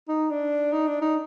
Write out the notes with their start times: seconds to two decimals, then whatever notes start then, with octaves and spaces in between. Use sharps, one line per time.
0.08 D#4
0.30 D4
0.72 D#4
0.87 D4
1.02 D#4